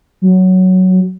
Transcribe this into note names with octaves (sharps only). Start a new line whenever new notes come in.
F#3